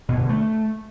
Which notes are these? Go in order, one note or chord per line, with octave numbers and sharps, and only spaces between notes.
B2
D3
A3